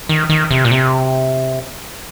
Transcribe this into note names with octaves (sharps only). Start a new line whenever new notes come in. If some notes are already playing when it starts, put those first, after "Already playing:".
D#3
D#3
C3
A#2
C3